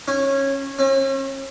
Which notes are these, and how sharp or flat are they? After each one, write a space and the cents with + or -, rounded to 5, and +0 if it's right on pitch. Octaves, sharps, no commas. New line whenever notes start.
C#4 -15
C#4 -40